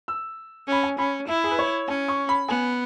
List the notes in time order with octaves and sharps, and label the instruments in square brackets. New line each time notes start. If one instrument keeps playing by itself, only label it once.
[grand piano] E6
[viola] C#4 [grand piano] B5
[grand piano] G#5
[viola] C#4 [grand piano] B5
[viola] E4 [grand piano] E5
[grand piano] G#4
B4
C#5
[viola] C#4 [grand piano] G#5
[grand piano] C#6
B5
[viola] B3 [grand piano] G#5